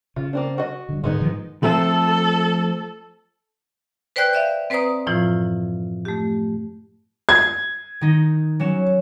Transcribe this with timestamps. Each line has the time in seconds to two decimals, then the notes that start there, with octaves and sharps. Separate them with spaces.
0.16 C#3 F4
0.33 A#3 C4 D4
0.58 F#4 D#5
0.89 G2 D3
1.04 G#2 D3 G#3 B3 D#4
1.20 G#2 D#3 F3
1.63 F3 A3 C4 A4
4.16 B4 C5 D5 G5 F#6 G6
4.33 D5 E5 F5
4.70 C4 B4 C5 D5 A#5 D#6
5.06 F#2 A2 E3 F3 E4 F4
6.05 A3 G4
7.29 G#6
8.01 D#3 D#4
8.60 F#3 C#4 E7